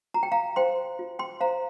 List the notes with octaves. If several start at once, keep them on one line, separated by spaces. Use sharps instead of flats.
F4 A#5
G5
F5 A#5
C5 G5 C6
F4
G5 C6
C5 F5 A#5